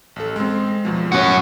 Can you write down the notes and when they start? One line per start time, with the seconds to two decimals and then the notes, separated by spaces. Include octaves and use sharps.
0.16 A1 A4
0.36 G#3 C4
0.85 E2 B2 F3
1.12 A2 C#4 F#4 F#6 C#7